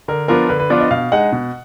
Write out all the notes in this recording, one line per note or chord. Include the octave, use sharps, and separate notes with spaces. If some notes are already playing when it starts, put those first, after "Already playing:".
D3 A#4
F3 B3 D4 F4 A#4
D3 B4
B4
F3 B3 D4 F4 D5
D#5
B2 F5
G#3 D#4 F#5
B2